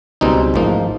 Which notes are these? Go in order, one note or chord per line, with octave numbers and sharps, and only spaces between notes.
C#2 B2 G3 C4 D#4
A1 G#2 F3 A#3 D#4